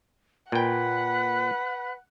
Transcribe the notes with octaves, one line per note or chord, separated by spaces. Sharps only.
A#2 B4 F#5 G5